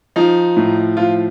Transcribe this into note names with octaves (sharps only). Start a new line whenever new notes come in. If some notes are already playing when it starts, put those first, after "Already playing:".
F3 D#4
A2
F3 F4